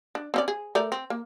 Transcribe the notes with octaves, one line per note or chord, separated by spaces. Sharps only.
D4
C4 C#4 D5
G#4
A3 A#4 D5
C4
A#3